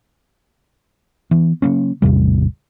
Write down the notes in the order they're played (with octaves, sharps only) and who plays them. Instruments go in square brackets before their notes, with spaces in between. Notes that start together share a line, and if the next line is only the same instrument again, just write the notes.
[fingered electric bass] E3 B3
C#3 F#3 A#3 C#4
A1 E2 C3 G3